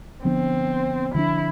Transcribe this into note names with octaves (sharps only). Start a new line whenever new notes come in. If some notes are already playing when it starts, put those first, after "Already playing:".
D3 F3 B3 C4 D4
D3 F3 B3 D4 E4